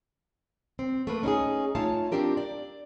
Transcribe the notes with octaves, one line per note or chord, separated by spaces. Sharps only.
C4
A3 A#3 B4
C#4 D#4 F#4 G#4
A3 D#4 F4 C#5 F5 A5
C4 D4 F4 G4 A#4
D5